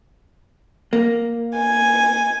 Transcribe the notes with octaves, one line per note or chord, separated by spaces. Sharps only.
A#3
G#5